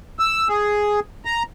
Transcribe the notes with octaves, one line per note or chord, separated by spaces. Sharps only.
E6
G#4
A#5